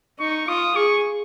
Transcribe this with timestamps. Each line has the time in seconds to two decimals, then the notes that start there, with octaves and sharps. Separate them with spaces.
0.20 D#4 C#6
0.48 F4 D#6
0.75 G#4 C#6